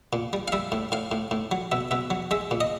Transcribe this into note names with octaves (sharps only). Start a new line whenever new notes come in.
A#2
G3
F5
G3 E5
A2
A2 F5
A2
A2
F#3
B2 E5
B2 E5
F#3
G#3 E5
A#2
D#5